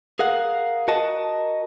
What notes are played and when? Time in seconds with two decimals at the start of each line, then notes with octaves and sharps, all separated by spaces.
0.19 G#4 A#4 F5 F#5
0.88 F#4 A#4 D#5 A5